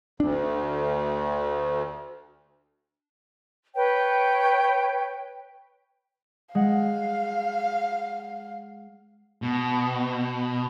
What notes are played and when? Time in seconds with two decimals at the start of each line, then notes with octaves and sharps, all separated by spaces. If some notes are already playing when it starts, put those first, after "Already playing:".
0.20 D2 D4
3.75 B4 C#5 G5
6.55 G#3 F5 F#5
9.42 B2